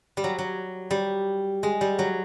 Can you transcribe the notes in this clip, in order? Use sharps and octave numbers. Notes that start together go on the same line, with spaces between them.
G3
F#3
F#3
G3
G#3
G3
F#3